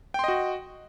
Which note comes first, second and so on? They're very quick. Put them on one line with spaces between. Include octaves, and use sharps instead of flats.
G5 C6 D#5 F#4